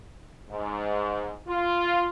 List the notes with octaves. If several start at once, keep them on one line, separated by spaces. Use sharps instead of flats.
G#2
F4